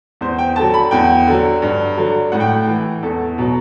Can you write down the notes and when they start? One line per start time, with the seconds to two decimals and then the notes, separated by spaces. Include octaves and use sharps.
0.21 E2 C5
0.39 G5
0.56 D3 F#3 A5
0.74 B5
0.91 E2 G5
1.27 D3 F#3
1.62 G2
1.97 D3 F#3
2.32 A2 F#5
2.40 G5
2.47 F#5
2.68 E3
3.03 E2 A4
3.38 B2 F#3